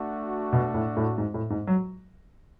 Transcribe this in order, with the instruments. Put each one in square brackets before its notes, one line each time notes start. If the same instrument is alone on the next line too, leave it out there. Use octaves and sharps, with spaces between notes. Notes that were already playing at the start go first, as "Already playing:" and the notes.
Already playing: [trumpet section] A3 D4 F#4
[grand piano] B2
A2
A2
G#2
A2
G#2
F#3